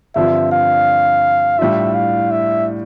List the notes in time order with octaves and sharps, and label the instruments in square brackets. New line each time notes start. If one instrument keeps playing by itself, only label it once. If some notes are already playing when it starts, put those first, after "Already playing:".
[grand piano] G2 D3 F3 C4 F4 [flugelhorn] E5
[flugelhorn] F5
[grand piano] A2 G3 D4 F4 [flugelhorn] E5
[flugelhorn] F5
E5